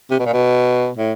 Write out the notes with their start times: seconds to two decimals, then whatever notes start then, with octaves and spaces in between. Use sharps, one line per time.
0.11 C3
0.19 B2
0.26 A#2
0.33 B2
0.97 A2